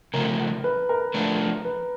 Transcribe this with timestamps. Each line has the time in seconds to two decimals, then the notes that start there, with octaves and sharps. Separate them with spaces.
0.14 C#3 F3 A3 A#4
0.64 B4
0.89 A#4
1.14 F3 A3 D4
1.65 B4